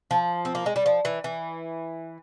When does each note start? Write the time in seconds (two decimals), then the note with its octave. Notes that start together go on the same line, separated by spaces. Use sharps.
0.11 F3
0.45 C4
0.55 A#3
0.66 G#3
0.76 G3
0.86 F3
1.05 E3
1.24 E3